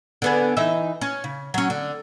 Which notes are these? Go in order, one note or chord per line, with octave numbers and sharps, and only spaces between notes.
D3 B3 G#4
E3 D#4 E5
C#4
C#3
F#3 C#4
D3